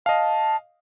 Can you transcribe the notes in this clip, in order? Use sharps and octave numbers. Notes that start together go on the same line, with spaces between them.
D#5 F5 A5